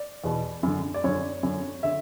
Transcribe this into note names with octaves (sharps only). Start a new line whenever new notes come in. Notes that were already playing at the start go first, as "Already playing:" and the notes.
Already playing: D5
E2 B2
F#2 D3
D5
F#2 D3 C#5
F#2 D3
D3 E5